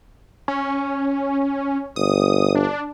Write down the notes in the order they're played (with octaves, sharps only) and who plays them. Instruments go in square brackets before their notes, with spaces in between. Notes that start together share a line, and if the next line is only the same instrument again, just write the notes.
[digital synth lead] C#4
[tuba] G1 [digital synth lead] D#6
[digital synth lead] D4